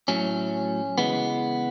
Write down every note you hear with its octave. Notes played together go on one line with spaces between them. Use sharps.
A2 F#3 A3 C#4
C#3 E3 G#3 B3